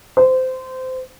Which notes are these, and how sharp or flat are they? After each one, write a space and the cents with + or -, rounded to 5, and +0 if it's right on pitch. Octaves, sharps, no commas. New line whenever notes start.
C5 -20